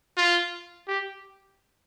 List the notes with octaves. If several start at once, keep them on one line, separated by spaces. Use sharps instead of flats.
F4
G4